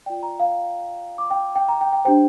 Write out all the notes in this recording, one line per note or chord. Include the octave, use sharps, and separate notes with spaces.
F4 D5 G5
A#5
F5
D6
G5
G5
A#5
G5
G5
D4 G4 C5 G5